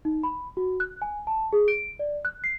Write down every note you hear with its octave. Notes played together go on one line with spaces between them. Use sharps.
D#4
B5
F#4
F#6
G#5
A5
G#4
D7
D5
F#6
C7